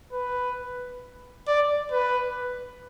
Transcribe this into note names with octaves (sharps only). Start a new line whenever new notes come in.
B4
D5
B4